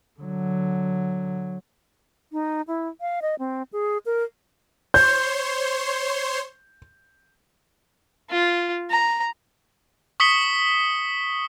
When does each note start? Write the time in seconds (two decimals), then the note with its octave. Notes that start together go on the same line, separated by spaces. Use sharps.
0.20 D3 F#3
2.32 D#4
2.68 E4
3.01 F5
3.22 D#5
3.39 C4
3.73 G#4
4.06 A#4
4.94 C5 C#5 C6 G6
8.31 F4
8.91 A#5
10.20 C#6 D#6 B6 C#7 G7